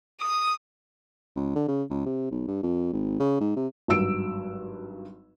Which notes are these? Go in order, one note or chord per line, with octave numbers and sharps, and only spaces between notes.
D#6
C#2
D3
C#3
C#2
C3
B1
G2
F2
G#1
C#3
G#2
C3
G#1 G2 F#3 E6 D7